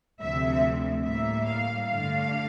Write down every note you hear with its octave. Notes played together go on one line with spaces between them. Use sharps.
D2 C3 F3 A3 C4 E5
A2 G3 A#3 E5
F5
G2 D3 A3 D4 F5